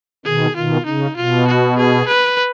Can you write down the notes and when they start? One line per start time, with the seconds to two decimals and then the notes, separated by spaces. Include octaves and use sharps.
0.25 B2 D#3 G#4
0.56 B2 D#3 F4
0.86 C#3 D#4
1.16 B2 F4
1.47 F#4
1.77 G#4
2.08 B4